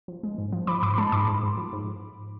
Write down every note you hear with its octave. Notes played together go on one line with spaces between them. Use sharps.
F3
G#3
G#2
F3
F3 B5 D6
G#2 B5 D6
B5
G#3 A5 C6
G#2 B5 D6
G#2
G#2
F3
G#2